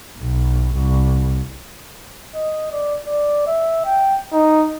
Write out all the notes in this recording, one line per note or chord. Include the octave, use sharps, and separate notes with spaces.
B1
C2
D#5
D5
D5
E5
G5
D#4